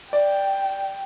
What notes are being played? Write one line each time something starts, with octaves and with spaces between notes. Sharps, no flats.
D5 G5